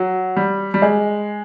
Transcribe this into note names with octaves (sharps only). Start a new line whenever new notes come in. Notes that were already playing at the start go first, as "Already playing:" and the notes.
Already playing: F#3
G3
G3
G#3